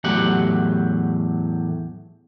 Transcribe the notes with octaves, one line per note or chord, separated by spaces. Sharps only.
E2 A2 F#3 G4 F#5